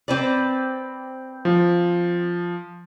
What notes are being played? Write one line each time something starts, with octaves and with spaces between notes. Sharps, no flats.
C4 B4 D5
F3